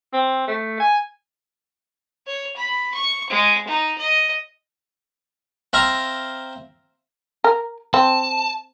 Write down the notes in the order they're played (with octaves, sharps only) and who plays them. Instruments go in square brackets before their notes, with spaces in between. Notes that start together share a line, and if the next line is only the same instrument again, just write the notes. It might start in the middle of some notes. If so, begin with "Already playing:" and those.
[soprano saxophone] C4
A3
G#5
[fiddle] C#5
B5
C#6
G#3
D#4
D#5
[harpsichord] C4 E5 F5 A#5
[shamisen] A#4
[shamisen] C4 [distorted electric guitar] A5